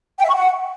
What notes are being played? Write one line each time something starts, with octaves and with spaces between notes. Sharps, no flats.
G5
E5
C#6
F#5